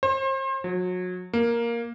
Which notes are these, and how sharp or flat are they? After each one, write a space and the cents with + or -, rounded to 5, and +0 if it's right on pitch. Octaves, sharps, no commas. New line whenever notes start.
C5 +35
F#3 -30
A#3 +5